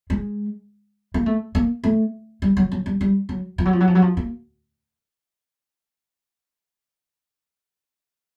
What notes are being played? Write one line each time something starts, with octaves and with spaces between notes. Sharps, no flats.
G#3
A#3
A3
A#3
A3
G3
F#3
F#3
G3
G3
F#3
F3
F#3
F3
F#3
F3
F#3
F3
A#3